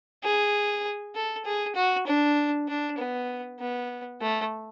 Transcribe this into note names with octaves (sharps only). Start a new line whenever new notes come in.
G#4
A4
G#4
F#4
D4
D4
B3
B3
A3